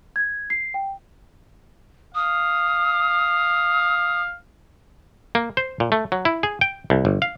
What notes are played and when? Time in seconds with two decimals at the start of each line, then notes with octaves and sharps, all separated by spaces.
0.16 G#6
0.50 C7
0.74 G5
2.15 F5 D#6
5.35 A#3
5.57 C5
5.80 A#2
5.92 A3
6.12 F#3
6.25 E4
6.43 G#4
6.61 G5
6.90 C2
7.05 G1
7.22 F5